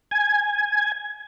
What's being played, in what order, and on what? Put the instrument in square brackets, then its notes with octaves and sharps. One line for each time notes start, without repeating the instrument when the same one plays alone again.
[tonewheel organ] G#5